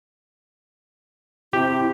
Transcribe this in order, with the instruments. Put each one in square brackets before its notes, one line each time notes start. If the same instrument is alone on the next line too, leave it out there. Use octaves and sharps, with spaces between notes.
[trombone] C3 [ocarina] E4 [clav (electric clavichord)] G4